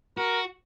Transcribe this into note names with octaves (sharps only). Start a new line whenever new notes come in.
F#4 A#4